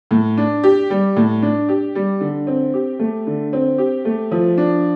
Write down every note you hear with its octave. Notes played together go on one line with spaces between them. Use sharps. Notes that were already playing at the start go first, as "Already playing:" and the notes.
A2
D4
G4
G3
A2
D4
G4
G3
D3
C4
G4
A3
D3
C4
G4
A3
F3
D4